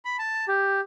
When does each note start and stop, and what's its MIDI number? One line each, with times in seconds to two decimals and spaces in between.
0.05 0.17 83
0.19 0.45 81
0.48 0.81 67